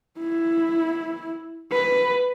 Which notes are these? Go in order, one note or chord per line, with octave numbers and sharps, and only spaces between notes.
E4
B4